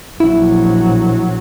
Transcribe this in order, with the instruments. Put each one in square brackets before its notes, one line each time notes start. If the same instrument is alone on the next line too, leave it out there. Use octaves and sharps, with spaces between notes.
[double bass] A#1 F#3 [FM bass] E4